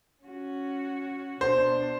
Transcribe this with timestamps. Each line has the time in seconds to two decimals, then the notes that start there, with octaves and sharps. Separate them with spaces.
0.23 C#4 F#4
1.41 B2 D4 C5